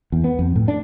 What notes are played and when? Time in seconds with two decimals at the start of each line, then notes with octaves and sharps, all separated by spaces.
0.12 E2
0.24 B3
0.39 F2
0.56 A2
0.68 D4